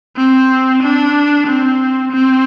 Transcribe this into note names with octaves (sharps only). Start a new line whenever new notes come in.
C4
D4
C4
C4